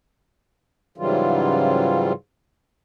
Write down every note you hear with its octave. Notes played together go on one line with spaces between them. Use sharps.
G#2 C#3 E3 F#3 G3 F4